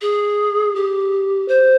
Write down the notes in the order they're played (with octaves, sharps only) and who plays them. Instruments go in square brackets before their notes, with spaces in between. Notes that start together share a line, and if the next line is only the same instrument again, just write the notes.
[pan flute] G#4
G4
C5